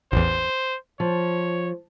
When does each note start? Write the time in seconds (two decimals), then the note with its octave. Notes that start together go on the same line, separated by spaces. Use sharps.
0.12 A1 E2 C5
1.00 F3 C#5